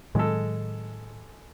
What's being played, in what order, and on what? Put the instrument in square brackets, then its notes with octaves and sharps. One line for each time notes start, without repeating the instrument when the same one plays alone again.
[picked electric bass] A2 D#3 F#3 [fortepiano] G#3 A4